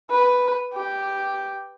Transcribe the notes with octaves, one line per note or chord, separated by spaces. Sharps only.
B4
G4